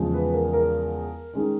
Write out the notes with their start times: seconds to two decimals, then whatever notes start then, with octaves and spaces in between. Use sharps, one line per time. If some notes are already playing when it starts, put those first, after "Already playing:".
Already playing: E2 C#3 F3 G#3
0.14 B4
0.33 A#4
0.53 A#4
1.34 D#3 G#3 C#4